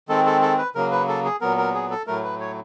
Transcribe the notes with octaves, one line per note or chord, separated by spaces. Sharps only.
D#3 G#3 C4 A4
A4
A4
B4
C#3 F#3 A#3 A#4
B4
A4
G#4
A#2 F#3 B3 A#4
A#4
G#4
A4
A2 F#3 A3 A#4
B4
C#5